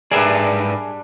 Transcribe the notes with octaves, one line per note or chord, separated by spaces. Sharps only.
G#2 G3 D4 G#4 A#4 B4 D5 E5